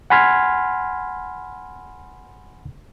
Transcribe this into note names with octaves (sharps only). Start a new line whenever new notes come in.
F#5 G#5 B5 C6 F6 G#6